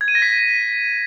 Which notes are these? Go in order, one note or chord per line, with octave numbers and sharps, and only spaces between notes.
G#6
D#7
A#6
B6